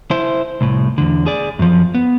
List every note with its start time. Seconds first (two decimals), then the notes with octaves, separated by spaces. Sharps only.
0.11 E4 C5
0.61 C2 A2
0.98 E2 D3
1.26 G#4 D5
1.59 F#2 F3
1.95 B3